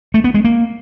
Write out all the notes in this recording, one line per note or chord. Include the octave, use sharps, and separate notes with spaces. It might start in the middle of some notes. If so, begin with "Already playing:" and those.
A3
B3
G#3
A#3